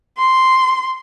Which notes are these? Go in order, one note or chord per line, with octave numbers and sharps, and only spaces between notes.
C6